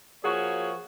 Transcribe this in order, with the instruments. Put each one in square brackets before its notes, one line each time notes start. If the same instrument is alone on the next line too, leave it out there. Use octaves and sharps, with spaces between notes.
[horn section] F3 A#3 F#4 G#4 C#5